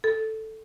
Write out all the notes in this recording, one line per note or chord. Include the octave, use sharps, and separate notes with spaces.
A4